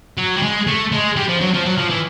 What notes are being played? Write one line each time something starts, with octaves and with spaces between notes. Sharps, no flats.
F#3
G3
G#3
A3
G#3
G3
F3
F#3
F3
F#3
F3
E3